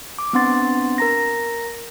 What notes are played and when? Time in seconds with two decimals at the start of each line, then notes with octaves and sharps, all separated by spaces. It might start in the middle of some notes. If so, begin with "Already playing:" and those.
0.19 D6
0.33 B3 C4 D4 F#5 C6 A6
0.98 A#4 A#5 A#6